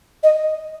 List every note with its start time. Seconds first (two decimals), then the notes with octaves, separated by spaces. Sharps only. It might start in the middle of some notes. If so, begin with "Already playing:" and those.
0.23 D#5